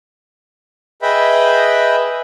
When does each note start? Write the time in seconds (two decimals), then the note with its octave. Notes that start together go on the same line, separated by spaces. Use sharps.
1.02 G#4 B4 D#5 E5 G5 B5